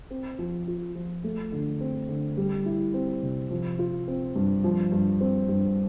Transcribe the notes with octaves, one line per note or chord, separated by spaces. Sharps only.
C4
F3
F4
F3
A3
D3
C4
D3
G3
E4
C4
C3
F3
F4
C4
G2
F3
G2
C4
G2